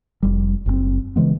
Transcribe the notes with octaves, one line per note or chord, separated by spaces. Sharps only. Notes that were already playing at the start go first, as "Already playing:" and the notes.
F1 G3
F#1 A2 C4
C#3 E3 G#3 B3